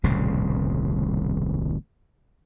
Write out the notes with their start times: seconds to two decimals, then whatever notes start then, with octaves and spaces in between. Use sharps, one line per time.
0.03 D#1 C2 A2 C#3